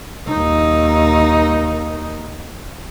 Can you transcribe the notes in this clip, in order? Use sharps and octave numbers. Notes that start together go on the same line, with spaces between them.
D#2 D#4